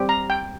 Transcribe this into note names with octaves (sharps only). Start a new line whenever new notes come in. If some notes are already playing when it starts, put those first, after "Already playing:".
Already playing: G3 C4 G4
A#5
G5